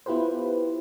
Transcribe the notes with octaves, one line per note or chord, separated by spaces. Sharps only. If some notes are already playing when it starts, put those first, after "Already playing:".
B3 E4 F4 G4 B4 C5